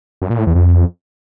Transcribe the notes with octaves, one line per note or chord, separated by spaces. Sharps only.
F#2
A#2
A2
E2
F2